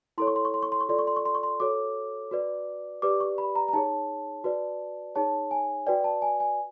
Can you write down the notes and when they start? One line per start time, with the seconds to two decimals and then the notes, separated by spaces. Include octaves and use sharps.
0.18 E4 A4 C#5 C6
0.27 C#6
0.36 C6
0.45 C#6
0.54 C6
0.63 C#6
0.72 C6
0.81 C#6
0.89 F4 A4 D5 C6
0.99 C#6
1.07 C6
1.16 C#6
1.25 C6
1.35 C#6
1.43 C6
1.60 F#4 A4 C#5 D6
2.31 F#4 B4 D5
3.02 G4 B4 D5 D6
3.20 C#6
3.38 B5
3.56 A#5
3.68 A#5
3.73 D#4 G#4 C#5 A5
4.44 F#4 B4 D5
5.15 D#4 G#4 C#5 A5
5.51 G#5
5.87 F#4 B4 D5 G5
6.04 A5
6.22 G#5
6.40 G#5